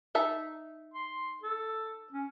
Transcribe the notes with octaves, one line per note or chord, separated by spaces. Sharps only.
D#4 E5 A5
C6
A4
C#4